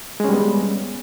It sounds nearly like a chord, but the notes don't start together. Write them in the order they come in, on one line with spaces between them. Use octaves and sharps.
G#3 C#4 G3 B3